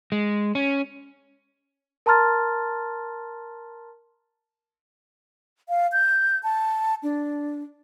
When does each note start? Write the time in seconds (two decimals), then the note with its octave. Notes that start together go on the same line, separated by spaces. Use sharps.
0.12 G#3
0.55 C#4
2.06 A#4 A5 A#5 C6 F6 A6
5.69 F5
5.92 G6
6.43 A5
7.03 D4